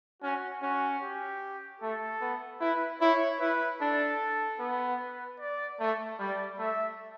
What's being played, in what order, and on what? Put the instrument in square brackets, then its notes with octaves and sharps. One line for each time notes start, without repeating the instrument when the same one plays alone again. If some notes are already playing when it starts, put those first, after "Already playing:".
[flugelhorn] C#4 [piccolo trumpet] F#4
[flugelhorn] C#4 [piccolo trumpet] F#4
[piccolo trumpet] G4
[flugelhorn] A3 [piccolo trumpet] A4
[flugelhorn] B3
[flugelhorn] E4 [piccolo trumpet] B4
[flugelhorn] E4 [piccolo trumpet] C#5
[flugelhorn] E4 [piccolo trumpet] B4
[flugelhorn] D4 [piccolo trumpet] A4
[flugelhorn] B3
[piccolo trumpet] B4
D5
[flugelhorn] A3
[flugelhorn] G3 [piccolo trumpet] D5
[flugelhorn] A3 [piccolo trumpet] E5